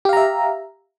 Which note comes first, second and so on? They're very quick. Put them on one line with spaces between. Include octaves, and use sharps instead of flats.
G4 F5 A#5 E5